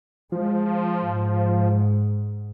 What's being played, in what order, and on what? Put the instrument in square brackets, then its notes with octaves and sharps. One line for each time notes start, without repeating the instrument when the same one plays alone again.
[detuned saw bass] F3 [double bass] G#3
[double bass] G#2